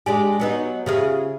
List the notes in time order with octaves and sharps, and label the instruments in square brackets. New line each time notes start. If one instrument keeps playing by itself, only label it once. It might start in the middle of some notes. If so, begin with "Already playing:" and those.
[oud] G#3 D4 G4 [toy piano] G#5
[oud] F#3 B3 D#4
[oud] C#3 F4 G#4 [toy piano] G4 C5 E5